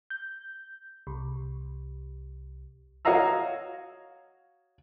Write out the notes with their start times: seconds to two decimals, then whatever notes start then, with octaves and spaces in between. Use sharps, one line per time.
0.10 G6
1.07 C2
3.05 F#4 C#5 D#5 F5 A#5 E6